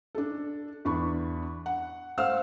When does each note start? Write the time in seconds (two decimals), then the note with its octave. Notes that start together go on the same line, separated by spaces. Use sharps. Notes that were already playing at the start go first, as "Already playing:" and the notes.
0.15 D4 A4
0.85 E2 D4 B5 C#6
1.66 F#5
2.18 A3 C5 F5 F#5 E6 F6